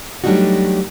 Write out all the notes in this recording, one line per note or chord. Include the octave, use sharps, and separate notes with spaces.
F#3 G3 A3 D4 D#4 F#4